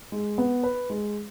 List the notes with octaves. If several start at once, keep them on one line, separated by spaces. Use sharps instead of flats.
G#3
B3
B4
G#3